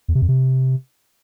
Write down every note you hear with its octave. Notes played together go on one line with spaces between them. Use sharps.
E2
C3
F2
C3